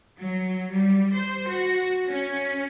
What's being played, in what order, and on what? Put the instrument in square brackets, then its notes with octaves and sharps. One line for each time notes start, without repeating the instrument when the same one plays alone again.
[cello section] F#3
G3
C5
F#4
C#4